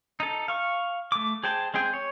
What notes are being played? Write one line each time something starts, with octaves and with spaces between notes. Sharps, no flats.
D#4 A4
F5 C#6
A3 D6
G#4 C5 G5 A5
G#3 C4 G#4 G5
C#5